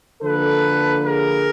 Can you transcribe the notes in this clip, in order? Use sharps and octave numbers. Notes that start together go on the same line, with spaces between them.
D3 F3 A#3 A4 B4
G#4 A#4